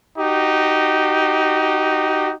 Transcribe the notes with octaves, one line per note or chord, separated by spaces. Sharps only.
D#4 F#4 G4